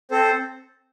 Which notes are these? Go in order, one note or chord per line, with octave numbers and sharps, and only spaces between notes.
C4 A4 C5